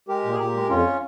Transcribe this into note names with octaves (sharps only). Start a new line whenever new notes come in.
G#3 G4 A#4
A#2
G#4
A#2 G4 A#4
G#3
F2 C#4 F4